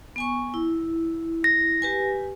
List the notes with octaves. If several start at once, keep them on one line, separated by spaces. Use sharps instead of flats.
B3 G#5 C#6
E4
A#6
G4 B4 G#5